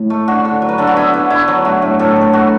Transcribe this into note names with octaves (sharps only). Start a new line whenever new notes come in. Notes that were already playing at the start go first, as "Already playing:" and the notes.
Already playing: A2
A3
D3 F#4
D3
F#3
B4
D3 A4
F#4
B3 E4
D3
D3 E4
F#3
A3 F#4
A2
A2 A4
A3 A4
A3 F#4